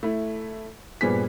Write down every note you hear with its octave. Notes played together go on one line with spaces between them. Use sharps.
A3 E4
G2 A#2 B3 G#4 C5 B6